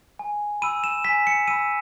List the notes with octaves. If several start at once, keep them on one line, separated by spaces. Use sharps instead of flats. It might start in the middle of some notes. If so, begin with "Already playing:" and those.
G#5
B5 E6 D#7
E7
G#5 B6
C#7
B5 E6 D#7